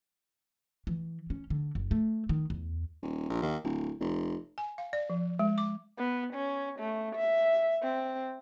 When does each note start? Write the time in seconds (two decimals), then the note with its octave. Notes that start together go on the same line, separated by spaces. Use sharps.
0.87 E3
1.30 C#4
1.50 D3
1.75 F#1
1.91 A3
2.29 D#3
2.50 E2
3.02 D#1
3.30 A#1
3.42 D#2
3.64 D1
4.01 F1
4.58 G#5
4.78 F5
4.93 D5
5.10 F3
5.39 G#3
5.58 D6
5.98 B3
6.34 C#4
6.79 A3
7.15 E5
7.82 C4